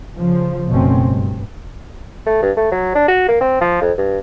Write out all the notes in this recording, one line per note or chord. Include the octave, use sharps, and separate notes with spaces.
C#3 F3
F#1 B2 A3 C4 C#4
G2
A3
G2
A3
F#3
D4
F#4
A#3
C4
F3
F2
G2